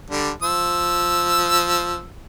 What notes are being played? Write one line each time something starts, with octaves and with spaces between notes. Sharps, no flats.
D3 G3
F3 E6